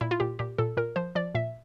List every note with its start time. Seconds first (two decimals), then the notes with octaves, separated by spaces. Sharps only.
0.01 A#2 E4
0.11 F4
0.20 A#2 G4
0.39 A#2 G4
0.58 A#2 A4
0.77 A#2 A#4
0.96 F3 C5
1.15 F3 D5
1.35 A#2 E5